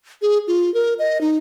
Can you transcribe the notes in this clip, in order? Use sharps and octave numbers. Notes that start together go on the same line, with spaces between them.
G#4
F4
A#4
D#5
D#4